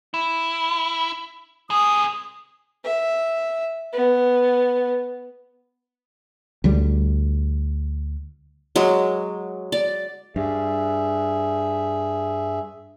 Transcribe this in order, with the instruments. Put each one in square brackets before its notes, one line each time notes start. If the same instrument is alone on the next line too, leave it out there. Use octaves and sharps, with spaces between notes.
[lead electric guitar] E4
[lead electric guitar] C3 G#4 [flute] D#6
[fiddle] E5
B3
[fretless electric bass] D2 G3
[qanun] F#3 G#3
D5
[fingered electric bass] G2 [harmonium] G#4 E5